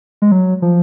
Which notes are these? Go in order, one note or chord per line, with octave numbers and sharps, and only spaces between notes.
G#3
F#3
F3